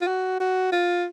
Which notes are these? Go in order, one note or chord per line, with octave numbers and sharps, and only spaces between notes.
F4
F#4
F#4
F4